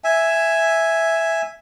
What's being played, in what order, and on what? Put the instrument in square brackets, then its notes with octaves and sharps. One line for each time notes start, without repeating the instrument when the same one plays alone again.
[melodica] E5 G#5